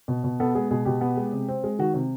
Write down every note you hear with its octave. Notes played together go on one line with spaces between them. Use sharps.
B2
B2
B3 A4
G#3 G#4
B2 G#4
B2 G4
B3
G#3
C3
C4
G#3
D#3 F#4
C3